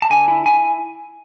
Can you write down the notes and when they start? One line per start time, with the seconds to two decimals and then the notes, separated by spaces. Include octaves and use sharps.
0.02 A5
0.10 D3 G#5
0.28 E4
0.46 E4 G#5